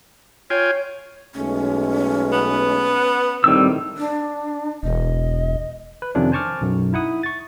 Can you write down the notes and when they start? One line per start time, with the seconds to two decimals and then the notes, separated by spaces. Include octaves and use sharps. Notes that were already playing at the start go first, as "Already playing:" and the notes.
0.50 F4 C#5 G5 G#5
1.35 B1 G#3 A3 C#4
2.32 B3
3.44 A#1 A2 D#3 G3 C4 E6
3.98 D4
4.83 E1 D#5
6.02 B4
6.15 F2 C3 D#3 F3 C#4 D4
6.32 C5 G#5 A5 C#6 D6 F6
6.61 B1 F#2
6.93 D#4 E4 F#5 D#6
7.23 C#6 A6